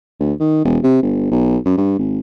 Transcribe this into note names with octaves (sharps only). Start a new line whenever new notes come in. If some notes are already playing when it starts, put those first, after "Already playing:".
D2
D#3
E1
C3
G1
B1
F#2
G2
G#1